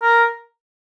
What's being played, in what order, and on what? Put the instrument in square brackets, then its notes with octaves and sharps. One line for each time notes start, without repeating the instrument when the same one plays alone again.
[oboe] A#4